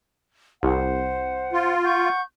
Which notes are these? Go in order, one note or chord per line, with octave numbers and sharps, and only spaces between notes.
C2 C5 F#5
F4
F#5 C#6 G6